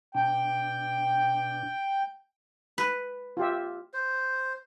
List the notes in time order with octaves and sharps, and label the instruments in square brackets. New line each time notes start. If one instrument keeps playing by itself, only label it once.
[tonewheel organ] B2 D4 [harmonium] G5
[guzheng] B4
[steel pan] F4 G4 E5
[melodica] C5